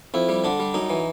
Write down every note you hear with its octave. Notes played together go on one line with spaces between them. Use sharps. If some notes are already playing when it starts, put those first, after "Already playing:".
F2 E4
G3
D3 D4
G3
F#2 D#4
E3